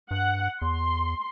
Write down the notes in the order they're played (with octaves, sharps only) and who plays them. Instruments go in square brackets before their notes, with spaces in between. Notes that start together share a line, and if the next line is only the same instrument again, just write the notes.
[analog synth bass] G2 [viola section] F#5
[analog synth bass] E2 [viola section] C6